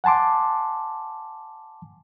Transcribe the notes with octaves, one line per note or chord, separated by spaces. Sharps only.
F#5 G#5 A5 C6 D6